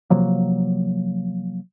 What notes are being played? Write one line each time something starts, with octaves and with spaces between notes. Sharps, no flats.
C3 F3 F#3 A#3